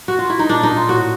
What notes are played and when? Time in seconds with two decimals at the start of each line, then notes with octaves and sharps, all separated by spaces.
0.08 F#4
0.19 F4
0.30 E4
0.39 D#4
0.49 A#2 D4
0.63 D#4
0.69 A#2
0.77 F4
0.88 A2 F#4